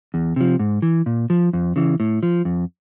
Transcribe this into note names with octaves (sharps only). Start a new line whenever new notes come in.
E2
C3 F3
G#2
E3
A#2
F3
F2
C#3 E3
A2
F3
F2